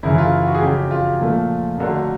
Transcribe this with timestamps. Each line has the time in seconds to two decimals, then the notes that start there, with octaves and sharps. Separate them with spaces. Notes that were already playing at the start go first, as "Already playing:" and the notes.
0.03 F#2 C#3 E3 E4
0.18 F4
0.47 F#4
0.55 G#4
0.61 F2 C#3 F#3 G4
0.91 F4
1.19 A#2 F3 A3
1.78 F2 D3 F#3 A3